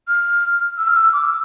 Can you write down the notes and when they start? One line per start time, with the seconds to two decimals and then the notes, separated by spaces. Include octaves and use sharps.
0.08 F6
0.78 E6
0.88 F6
0.96 E6
1.13 D6
1.25 E6